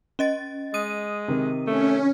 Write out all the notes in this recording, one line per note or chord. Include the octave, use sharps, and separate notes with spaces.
C#4 D#5 A6
G#3 D#6 D#7
C3 D#3
A3 C#4